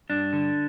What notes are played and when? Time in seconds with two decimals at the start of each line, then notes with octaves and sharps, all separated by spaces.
0.10 G2 D4
0.33 D3